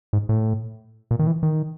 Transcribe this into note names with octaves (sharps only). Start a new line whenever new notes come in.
G#2
A2
A#2
D#3
E3
D#3